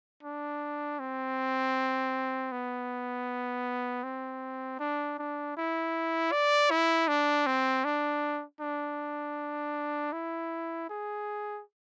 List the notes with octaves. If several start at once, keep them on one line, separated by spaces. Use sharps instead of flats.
D4
C4
B3
C4
D4
D4
E4
D5
E4
D4
C4
D4
D4
E4
G#4